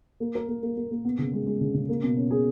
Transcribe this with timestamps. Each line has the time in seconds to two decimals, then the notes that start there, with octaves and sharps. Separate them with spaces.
0.20 A#3
0.35 A#4
0.48 A#3
0.63 A#3
0.77 A#3
0.91 A#3
1.05 B3
1.18 C#3
1.33 G#3
1.46 G#3
1.61 C#3
1.74 C#3
1.89 A#3
2.03 B2
2.17 C#4
2.31 G#4